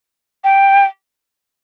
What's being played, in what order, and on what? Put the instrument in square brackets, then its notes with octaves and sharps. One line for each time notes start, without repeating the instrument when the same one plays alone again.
[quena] G5